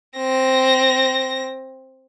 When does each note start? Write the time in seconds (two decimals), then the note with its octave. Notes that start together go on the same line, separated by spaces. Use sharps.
0.17 C4 A#6